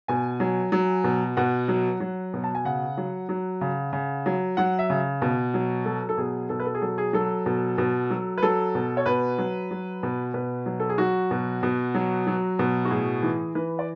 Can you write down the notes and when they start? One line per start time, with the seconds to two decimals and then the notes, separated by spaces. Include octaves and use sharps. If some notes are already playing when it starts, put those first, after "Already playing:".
0.08 B2 G#5
0.40 F#3
0.72 F#3
1.04 B2
1.37 B2 F#5
1.68 F#3
2.00 F#3
2.34 B2
2.44 A5
2.55 G#5
2.65 C#3 F#5
2.97 F#3
3.29 F#3
3.61 C#3
3.93 C#3
4.26 F#3
4.57 F#3 F#5
4.79 E5
4.90 C#3
5.22 B2
5.54 F#3
5.85 F#3 A4
6.09 A4
6.18 B2 G#4
6.49 B2 A4
6.60 B4
6.66 A4
6.74 G#4
6.82 F#3 A4
6.98 G#4
7.13 F#3 A4
7.46 B2
7.78 B2
8.10 F#3
8.38 B4
8.43 F#3 A4
8.75 B2
8.97 C#5
9.06 B2 B4
9.38 F#3
9.71 F#3
10.03 B2
10.34 B2 B4
10.66 F#3
10.80 A4
10.89 G#4
10.98 F#3 F#4
11.31 B2
11.63 B2
11.95 F#3
12.27 F#3
12.59 B2
12.85 F#4
12.90 A2 G#4
13.23 E3
13.55 E3 B4
13.79 D5